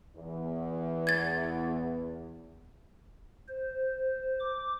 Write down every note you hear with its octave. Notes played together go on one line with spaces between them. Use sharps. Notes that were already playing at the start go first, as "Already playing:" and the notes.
E2
G#6 A6
C5
D6